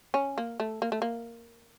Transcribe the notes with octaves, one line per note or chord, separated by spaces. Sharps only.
C#4
A#3
A3
A#3
A3
A#3